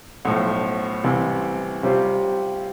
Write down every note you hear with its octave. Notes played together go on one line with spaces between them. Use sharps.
B1 A2 F3
C2 C3 E3
C3 G3 C4 F4